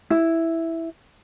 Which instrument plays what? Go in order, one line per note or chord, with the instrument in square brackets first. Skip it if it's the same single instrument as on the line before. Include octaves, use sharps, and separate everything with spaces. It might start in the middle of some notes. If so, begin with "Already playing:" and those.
[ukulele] E4